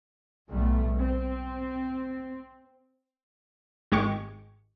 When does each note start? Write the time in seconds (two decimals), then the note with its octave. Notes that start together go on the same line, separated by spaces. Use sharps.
0.50 B1 A2 G3 A3
0.97 C4
3.92 G#1 G#3 G4 C#6